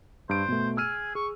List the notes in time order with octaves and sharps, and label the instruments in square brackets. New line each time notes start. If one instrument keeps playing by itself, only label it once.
[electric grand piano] G2 D7 [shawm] C5
[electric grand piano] B2 A3
[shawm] G#4 [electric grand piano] E6 F6 D#7
[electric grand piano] G#4 [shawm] C#6